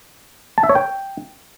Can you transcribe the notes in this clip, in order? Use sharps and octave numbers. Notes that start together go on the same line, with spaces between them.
A5
E5
C#5
G5